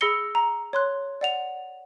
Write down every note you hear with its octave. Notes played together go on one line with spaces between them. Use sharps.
G#4 B5 E6 A#6 C#7 G7
A#5
C#5 C6 F#6
D5 F#5 F7